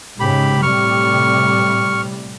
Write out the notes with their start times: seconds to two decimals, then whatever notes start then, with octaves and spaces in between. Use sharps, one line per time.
0.20 G#2 C#3 G4 B5
0.62 A2 C3 G3 C#6 F6